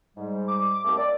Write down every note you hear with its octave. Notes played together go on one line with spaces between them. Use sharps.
G#2 G3
D6
D#2 A3 C4
D5